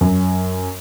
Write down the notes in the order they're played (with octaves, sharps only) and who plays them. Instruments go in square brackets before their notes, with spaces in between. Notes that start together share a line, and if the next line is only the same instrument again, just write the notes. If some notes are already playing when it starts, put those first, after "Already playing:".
[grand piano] F#2